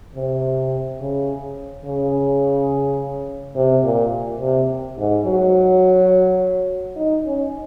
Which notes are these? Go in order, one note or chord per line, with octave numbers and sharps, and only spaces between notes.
C3
C#3
C#3
C3
A#2
C3
G#2
F#3
D#4
C#4